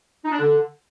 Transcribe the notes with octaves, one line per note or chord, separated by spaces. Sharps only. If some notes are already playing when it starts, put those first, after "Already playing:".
D#4
D4
D3